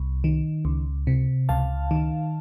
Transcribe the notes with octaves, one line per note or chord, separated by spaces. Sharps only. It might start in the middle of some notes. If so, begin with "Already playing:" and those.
Already playing: C2
D#3
C#2
C3
C#2 F5 A5
D#3